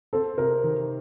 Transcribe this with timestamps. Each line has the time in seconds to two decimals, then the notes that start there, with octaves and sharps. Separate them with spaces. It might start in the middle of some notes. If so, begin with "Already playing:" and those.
0.13 C4 A4
0.38 C3 A#4
0.64 D#3